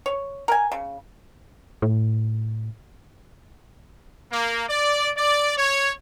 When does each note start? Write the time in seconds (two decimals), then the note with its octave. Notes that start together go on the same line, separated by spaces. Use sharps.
0.06 C#5
0.48 A#4 G#5
0.72 C#3
1.82 A2
4.32 A#3
4.69 D5
5.17 D5
5.58 C#5